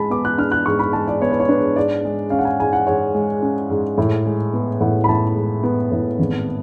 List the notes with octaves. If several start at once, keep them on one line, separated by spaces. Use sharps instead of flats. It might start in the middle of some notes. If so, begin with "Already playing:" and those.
Already playing: G#2 G#3 A5 B5
B3 D6
F#6
D4 F6
F#6
G#2 C#6
B5
G#3 A5
D5
B3 C#5
B4
C#5
D4 B4
G#2 D5
G#3
C#4 F5
F#5
G#5
G#2 G#5
F#5
G#2 C#5
G#3
C#4
G#2
A2
G#3
B3
A2 F#5
B5
A2 A5
G#3
B3
A2
G#1